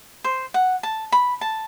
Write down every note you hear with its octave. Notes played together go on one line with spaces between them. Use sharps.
C5
F#5
A5
B5
A5